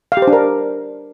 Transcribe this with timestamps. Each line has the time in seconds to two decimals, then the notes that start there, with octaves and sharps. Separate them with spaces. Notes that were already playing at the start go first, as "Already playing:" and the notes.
0.12 F5
0.17 G4
0.22 C5
0.27 D4
0.33 A#4